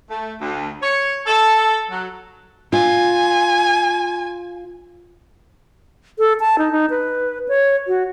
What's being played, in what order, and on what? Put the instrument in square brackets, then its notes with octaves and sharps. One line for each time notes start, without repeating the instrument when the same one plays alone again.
[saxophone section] A3
D2
C#5
A4
F#3
[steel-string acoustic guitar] F4 [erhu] G#5
[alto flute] A4
A5
D#4
D#4
B4
C#5
F#4